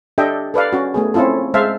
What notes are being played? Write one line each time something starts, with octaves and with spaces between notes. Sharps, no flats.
D4 G4 A4 D#5 E5 G5
A4 B4 D5 F5
C#4 F#4
A3 B3 G#4
C4 C#4 E4 F4 A4
G#3 C5 E5 F5 A5